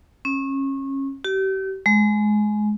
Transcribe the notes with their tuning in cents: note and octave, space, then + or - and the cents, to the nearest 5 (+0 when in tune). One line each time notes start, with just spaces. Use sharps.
C#4 -30
G4 -35
G#3 +20